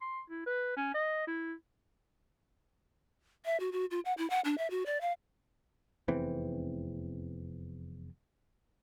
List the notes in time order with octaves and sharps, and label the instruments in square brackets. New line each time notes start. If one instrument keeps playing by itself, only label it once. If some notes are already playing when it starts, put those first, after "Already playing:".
[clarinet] C6
E4
B4
C#4
D#5
E4
[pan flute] E5
F#4
F#4
F4
F#5
E4
F#5
D4
E5
F#4
D5
F5
[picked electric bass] F1 E2 E3 C4